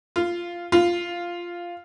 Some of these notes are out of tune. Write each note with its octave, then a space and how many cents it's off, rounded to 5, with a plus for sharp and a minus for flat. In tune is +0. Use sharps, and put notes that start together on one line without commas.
F4 -10
F4 -5